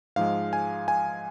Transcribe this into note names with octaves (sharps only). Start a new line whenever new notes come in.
G#2 F3 G#3 F5
G#5
G#5